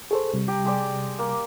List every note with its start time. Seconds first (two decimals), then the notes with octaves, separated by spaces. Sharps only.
0.11 G#4 A4 C5 C#6
0.34 C3 G3
0.48 G4 A#5
0.65 G#3 G4 D5
1.19 A#3